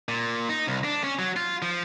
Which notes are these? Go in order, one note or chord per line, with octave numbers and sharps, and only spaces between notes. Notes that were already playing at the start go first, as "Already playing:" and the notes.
A#2
D#4
C2
D4
C#4
F#3
F4
F3